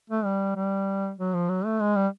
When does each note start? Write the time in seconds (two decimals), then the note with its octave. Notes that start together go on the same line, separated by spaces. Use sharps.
0.10 A3
0.25 G3
0.56 G3
1.18 F#3
1.34 F3
1.49 F#3
1.65 A3
1.80 G#3
1.96 G3